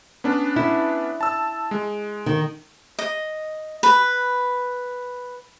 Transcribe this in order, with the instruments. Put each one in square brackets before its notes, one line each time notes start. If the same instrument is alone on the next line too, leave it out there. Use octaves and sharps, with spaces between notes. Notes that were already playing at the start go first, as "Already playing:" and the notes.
[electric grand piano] B3 C#4 D4
[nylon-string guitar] E4
[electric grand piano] A5 E6
G#3
[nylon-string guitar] D#3
[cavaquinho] D#5
B4